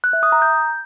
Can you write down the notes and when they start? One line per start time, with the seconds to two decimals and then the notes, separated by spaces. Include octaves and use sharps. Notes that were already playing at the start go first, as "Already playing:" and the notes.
0.04 F#6
0.13 E5
0.23 D#6
0.32 A#5
0.42 G6